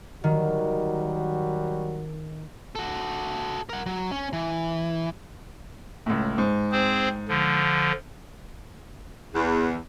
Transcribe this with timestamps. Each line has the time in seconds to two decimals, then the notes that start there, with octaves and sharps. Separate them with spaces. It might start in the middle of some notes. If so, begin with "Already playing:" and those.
0.24 D#3 F#3 G3 F#4
2.75 F#4 A4
3.69 A#4 F#5
3.86 F#3
4.11 C#4
4.33 E3
6.06 C#2 A2
6.38 G#2
6.72 C4 G#4 C5
7.28 D3 F3
9.35 E2